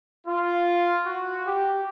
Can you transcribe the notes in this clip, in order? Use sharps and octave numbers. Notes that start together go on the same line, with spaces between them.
F4
F#4
G4